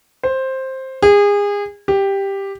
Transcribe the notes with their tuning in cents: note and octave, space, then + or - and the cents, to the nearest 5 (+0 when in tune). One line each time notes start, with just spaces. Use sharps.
C5 +10
G#4 -30
G4 +5